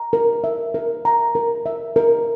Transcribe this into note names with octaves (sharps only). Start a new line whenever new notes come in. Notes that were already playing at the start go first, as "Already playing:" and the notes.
Already playing: A#5
A#4
E5
A#4
A#5
A#4
E5
A#4